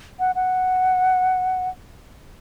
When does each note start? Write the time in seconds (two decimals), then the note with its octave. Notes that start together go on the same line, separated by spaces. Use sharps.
0.20 F#5
0.35 F#5